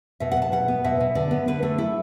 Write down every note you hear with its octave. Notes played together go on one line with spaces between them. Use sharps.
B2 E5
F#5
B2
A5
B2 F#5
B3
B2 E5
B2
D3 D5
B3
D3 B4
A3 A4
E4 A4